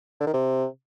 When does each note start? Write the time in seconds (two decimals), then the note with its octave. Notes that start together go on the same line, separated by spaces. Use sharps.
0.21 D3
0.27 D#3
0.34 C3